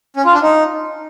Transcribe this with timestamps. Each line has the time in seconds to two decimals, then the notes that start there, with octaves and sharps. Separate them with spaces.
0.16 C#4
0.25 F4
0.33 D4
0.42 D#4